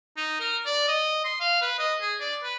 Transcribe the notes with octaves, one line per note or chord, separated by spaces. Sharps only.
D#4
A#4
D5
D#5
C6
F5
B4
D#5
G#4
D5
B4